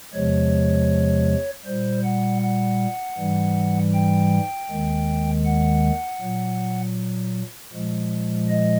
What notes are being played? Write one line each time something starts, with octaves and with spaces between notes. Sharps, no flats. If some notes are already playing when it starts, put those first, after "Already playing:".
E2 C3 F3 G#3 C#5
A#2 G3 C5
F#5
F#5
G#2 E3 G3
G5
D#2 D#3 G#3
F#5
A#2 F#3
A#2 F3 G#3
D#5